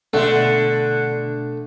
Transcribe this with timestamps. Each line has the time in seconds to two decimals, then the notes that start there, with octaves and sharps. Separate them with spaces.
0.13 B2 D3 A3 A4